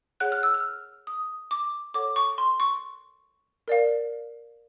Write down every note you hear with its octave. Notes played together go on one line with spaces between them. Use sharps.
G#4 C#5 F#5 F#6
F6
E6
F6
D#6
D6
A4 C#5 F#5 D6
C#6
C6
C#6
A#4 D5 F5